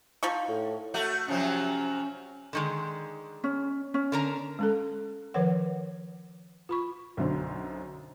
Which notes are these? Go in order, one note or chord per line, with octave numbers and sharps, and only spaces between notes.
F3 D#4 C#6
A2
A3 F#4
C3 F3 F#3 C#4
D3 D#3 G#3
C#4
C#4
D3 A#4 A#5
G#3 C#4 A4
D#3 F3 A#4 B4 C#5 F#5
F4 B5 C#6
B1 F#2 D3 C5